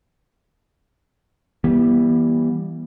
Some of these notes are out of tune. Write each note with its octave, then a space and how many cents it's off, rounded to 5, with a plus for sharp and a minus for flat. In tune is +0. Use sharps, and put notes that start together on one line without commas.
E3 +0 G3 +0 B3 -40